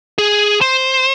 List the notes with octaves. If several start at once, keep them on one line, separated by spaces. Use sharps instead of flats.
G#4
C5